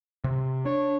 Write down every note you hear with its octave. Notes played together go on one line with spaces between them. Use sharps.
C3
D4 C#5